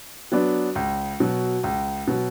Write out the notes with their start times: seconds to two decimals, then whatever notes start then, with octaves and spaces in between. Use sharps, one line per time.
0.32 F#3 B3 D4
0.75 C#2
1.20 B2 F#3
1.64 C#2
2.07 B2 F#3